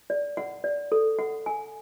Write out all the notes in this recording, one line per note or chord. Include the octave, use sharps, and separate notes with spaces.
D5
F#5
D5
A4
F#5
G#5